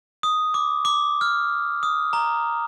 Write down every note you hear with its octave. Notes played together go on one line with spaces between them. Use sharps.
D#6
D6
D6
F6
D#6
A#5